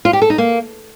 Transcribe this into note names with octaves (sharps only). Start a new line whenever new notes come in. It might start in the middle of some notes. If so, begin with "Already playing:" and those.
F4
G4
A4
D#4
A#3